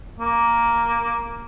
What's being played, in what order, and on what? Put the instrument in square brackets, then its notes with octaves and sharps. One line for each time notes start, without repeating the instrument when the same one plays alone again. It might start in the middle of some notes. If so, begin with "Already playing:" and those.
[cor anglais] A#3